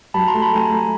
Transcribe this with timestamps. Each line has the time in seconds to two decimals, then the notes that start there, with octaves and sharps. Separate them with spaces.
0.14 F#3 A5 B5
0.28 A#5 C6
0.34 A3
0.42 A5 B5
0.52 A3 G#5 A#5
0.70 A3